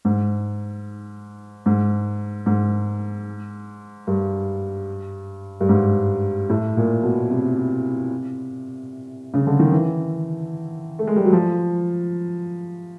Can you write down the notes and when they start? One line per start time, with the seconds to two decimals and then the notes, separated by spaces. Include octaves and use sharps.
0.05 G#2
1.66 G#2
2.46 G#2
4.07 G2
5.61 G2
5.69 G#2
6.49 A2
6.77 A#2
7.03 B2
7.30 C3
9.34 C#3
9.47 D3
9.59 D#3
9.72 E3
10.99 A3
11.07 G#3
11.16 G3
11.25 F#3
11.33 F3